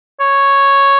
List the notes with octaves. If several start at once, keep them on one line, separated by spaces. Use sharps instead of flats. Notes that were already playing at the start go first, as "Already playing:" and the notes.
C#5